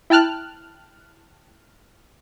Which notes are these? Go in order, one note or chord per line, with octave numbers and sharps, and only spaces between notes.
E4 G5 A5 F6 F#6